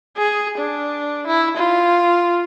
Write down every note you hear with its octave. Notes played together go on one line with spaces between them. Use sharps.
G#4
D4
E4
F4